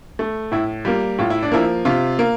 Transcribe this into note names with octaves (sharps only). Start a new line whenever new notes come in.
A3
A2 E4
G3 A#3 F4
A2 F4
E4
D4
F3 A#3 E4
C3 F4
A#3